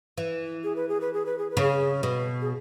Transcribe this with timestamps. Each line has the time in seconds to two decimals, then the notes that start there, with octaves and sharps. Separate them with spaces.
0.18 E3
0.64 G#4
0.76 B4
0.89 G#4
1.01 B4
1.13 G#4
1.26 B4
1.38 G#4
1.50 B4
1.57 C#3
1.63 G#4
2.03 B2
2.42 G#4